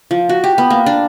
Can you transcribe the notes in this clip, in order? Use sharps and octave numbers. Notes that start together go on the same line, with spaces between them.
F3
F#4
G4
B3
A#3
D4